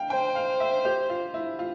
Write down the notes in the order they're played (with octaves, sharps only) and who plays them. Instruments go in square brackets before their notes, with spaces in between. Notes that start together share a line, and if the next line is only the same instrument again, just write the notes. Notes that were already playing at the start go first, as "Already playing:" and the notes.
Already playing: [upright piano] F5 G5
[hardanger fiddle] C5 [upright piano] G5
[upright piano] F5
E5
G4
F4
E4
F4